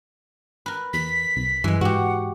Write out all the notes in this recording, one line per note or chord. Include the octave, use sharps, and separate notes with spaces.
A#4 B4
E2 B6
C2
G2 E3 G#3
G#2 F#4 G4 F#5